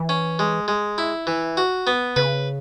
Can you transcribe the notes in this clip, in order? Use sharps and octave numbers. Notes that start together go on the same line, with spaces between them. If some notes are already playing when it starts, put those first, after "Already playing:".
Already playing: E3
C#4
G#3
G#3
E4
E3
F#4
B3
C#3 B4